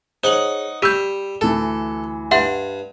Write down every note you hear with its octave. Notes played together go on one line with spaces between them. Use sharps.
D#4 G#4 C5 C#5 F#5 F#7
G3 G4 E6 G6 B6
D2 E3 A4
G2 E5 F#5 C6